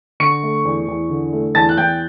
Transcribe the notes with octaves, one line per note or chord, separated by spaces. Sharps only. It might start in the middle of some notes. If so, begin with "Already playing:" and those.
D3 C#6 C#7
A3
E2
E2
D3
A3
E2 A5 A6
F#6
E2 G5 G6